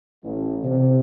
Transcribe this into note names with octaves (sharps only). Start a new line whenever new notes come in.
A1
C3